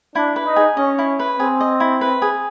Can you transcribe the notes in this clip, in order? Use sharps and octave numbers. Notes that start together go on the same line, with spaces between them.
D4 E4
B4
D#4
G#4
C#4 D#5
E4
B4
C4 G#4
D#5
E4
B4
G#4